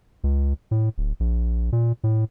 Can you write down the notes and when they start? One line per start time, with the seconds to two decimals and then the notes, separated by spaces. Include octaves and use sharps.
0.24 C#2
0.71 A2
0.98 D1
1.20 A#1
1.72 A#2
2.04 A2